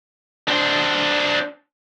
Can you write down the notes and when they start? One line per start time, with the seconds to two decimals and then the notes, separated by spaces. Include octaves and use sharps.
0.48 D4 C5